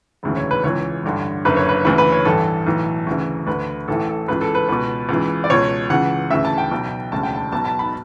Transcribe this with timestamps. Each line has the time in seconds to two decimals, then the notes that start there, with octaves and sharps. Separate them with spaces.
0.23 E1 D2 C#3 E3
0.37 C#5
0.51 B4
0.63 C#2 C#3 E3 C#5
1.04 A1 G2 D3
1.45 F#1 F#2 D3 B4
1.57 C#5
1.69 B4
1.85 D2 C#3 E3 B4
1.98 B4
2.12 C#5
2.25 A1 G2 E3 A4
2.67 B1 A2 E3
3.07 D2 C#3 E3
3.47 D2 D3 B4
3.88 A1 A2 E3 A4
4.09 A4
4.28 C#2 C#3 E3 B4
4.41 A4
4.55 B4
4.68 C#2 B2 B4
5.09 C#2 C#3 E3
5.44 D5
5.50 C#2 B2 C#5
5.90 C#2 C#3 E3 F#5
6.30 D2 C#3 E3 E5
6.45 A5
6.58 G5
6.71 B1 B2
7.12 E1 D2 C#3 A5
7.23 G5
7.35 A5
7.52 B1 B2 A5
7.65 A5
7.79 B5